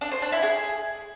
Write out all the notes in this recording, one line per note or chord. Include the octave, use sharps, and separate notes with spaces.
D4
C5
D4
E4
G#4